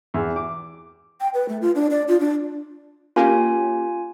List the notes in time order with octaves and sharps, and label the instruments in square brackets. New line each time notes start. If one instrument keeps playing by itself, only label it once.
[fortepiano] E2
D6
[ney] G5
B4
A3
F4
D4
D5
F4
D4
[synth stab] A#3 C#4 G4 [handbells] F4 G#5